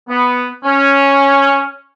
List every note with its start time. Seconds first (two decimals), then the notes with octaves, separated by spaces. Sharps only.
0.09 B3
0.64 C#4